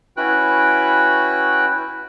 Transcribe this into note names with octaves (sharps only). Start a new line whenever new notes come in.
C#4 E4 F#4 B4 G5 F#6